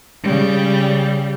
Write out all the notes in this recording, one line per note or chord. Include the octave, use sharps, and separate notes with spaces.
C#3 G3